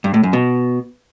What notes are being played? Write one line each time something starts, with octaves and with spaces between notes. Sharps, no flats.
G2
A2
F#2
B2